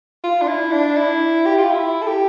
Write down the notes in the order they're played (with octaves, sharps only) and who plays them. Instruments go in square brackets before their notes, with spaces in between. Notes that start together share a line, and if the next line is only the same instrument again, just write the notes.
[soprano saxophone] F4
D4
E4
D4
E4
G4
F4
E4
A4
G4